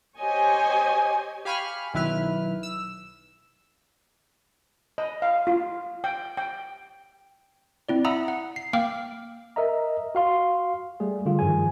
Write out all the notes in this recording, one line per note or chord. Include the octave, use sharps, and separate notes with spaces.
G4 C5 C#5 D#5 G#5
G4 F5 G#5 B5 C#6 F6
B1 D#3 E4 B4 F6
E6
D#5
F5
F4
G5
G5
C4 E4 D5
E5 F#5 A#5 B5 D#6 E6
F#5
C7
A#3 F5 G5 D6 F6
A#4 D#5 E5 A#5
F#4 F5 C6
G3 A3 G#4
D3 G3 F4 G4
G2 D#3 F3 G#4 G#5